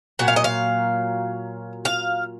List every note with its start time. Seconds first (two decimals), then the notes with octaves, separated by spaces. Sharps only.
0.19 A#2 F#3 F#5
0.28 F5
0.36 D#5
0.44 F5
1.85 F5